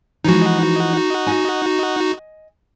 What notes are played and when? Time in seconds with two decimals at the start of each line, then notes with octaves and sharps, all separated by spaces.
0.24 E3 F3 G#3 D#4 F#4
1.26 D#5 G#5